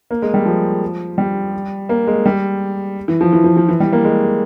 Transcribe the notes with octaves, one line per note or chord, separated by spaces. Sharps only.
A#3
G#3
G3
F3
G3
A#3
G#3
G3
E3
F3
E3
F3
F3
E3
G3
A#3
G#3